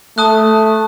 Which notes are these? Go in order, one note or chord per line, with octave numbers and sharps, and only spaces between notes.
A3 A5 D#6 F#6